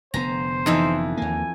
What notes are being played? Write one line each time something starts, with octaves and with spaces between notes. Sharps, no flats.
F1 D3 B3 C5 A#5
F2 E3 D#4 E5
D#2 A#3 G#5